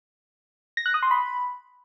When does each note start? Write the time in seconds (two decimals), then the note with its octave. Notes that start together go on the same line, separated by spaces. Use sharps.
0.77 A#6
0.86 F#6
0.94 D#6
1.03 C6
1.11 B5